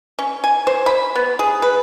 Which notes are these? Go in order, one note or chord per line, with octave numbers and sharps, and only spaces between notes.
C#4
G#5
C5
B5
B3
G#4
B4